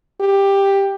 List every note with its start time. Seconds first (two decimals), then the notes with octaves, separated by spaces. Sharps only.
0.21 G4